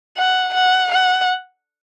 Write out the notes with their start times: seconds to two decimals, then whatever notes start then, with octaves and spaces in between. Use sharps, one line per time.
0.17 F#5
0.54 F#5
0.92 F#5